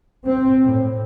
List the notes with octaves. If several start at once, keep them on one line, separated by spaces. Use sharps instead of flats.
C4
A2